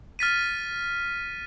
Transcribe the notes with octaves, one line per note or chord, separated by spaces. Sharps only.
F6 A6 B6 D#7